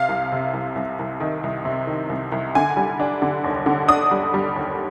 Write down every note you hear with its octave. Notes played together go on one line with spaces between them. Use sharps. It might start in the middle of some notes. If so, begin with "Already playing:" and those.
Already playing: C3 F5
C2
C3
C2
C2
C2
D#3
C2
C3
D#3
C2
C2
D3 G#5
G3
D4
D3
D#2
D3
D4 D#6
G3
G3
D#2